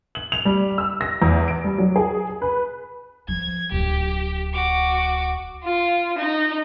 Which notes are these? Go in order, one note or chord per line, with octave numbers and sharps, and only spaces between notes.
F#7
F7
G3
E6
A#6
E2
D7
G3
F#3
G#4
B4
F3 G#6
D1 F#2 G4
F#4 D6
F4
D#4